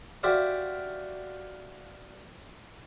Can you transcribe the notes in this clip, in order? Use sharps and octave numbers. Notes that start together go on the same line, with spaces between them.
F#4 G4 C5 D5 E5 F5